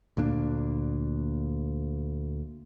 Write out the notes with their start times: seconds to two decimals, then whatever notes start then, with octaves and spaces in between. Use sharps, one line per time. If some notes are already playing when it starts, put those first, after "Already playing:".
0.17 D2 A#2 A#3 D4